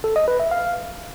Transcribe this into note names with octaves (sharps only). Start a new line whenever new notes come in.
A4
D#5
B4
E5
F5